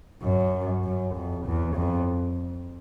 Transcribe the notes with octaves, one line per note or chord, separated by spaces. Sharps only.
F#2
F#2
F2
E2
F2